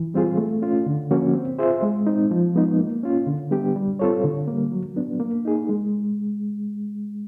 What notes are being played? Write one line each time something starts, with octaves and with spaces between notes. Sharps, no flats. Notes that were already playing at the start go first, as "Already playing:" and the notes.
Already playing: E3
G3 C4 F4 G#4
A3
C#4 F4
D3
F3 A#3 C#4 F#4
C4
F4 G#4 C5 E5
G#3
C4 D#4
F3
G#3 B3 D#4
A#3
C#4 F4
D3
G3 B3 D4 G4
G3
C4 F4 A4 C#5
D3
G3 A#3
F#3
B3 D4
A#3
D#4 G#4
G#3